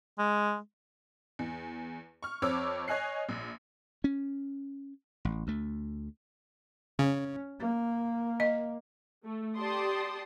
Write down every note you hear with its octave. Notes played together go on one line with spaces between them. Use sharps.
G#3
E2
C#6 F6
F2 C4 C#5 D6 E6
C#5 D#5 G#5 F#6 C7
A#1
C#4
A1
D2 A3
C#3 C#4
A#3
D#5
A3
G4 D5 A5 C6 D#6